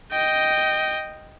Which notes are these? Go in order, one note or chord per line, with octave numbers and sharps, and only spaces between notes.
D#5 G5